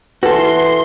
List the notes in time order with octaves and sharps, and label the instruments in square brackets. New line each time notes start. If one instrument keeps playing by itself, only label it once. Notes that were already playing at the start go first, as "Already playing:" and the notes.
[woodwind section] E3 [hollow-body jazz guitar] F#4 A4 [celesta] B4 [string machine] C6